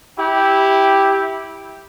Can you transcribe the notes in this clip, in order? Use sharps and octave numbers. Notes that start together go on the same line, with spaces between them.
E4 G4